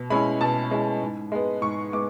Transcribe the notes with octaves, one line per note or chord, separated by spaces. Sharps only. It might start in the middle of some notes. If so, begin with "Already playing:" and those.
Already playing: B2
G#3 C#4 E4 B5
B2 A5
G#3 C#4 E4
G#2
G#3 B3
G#2 C#6
G#3 B3 D6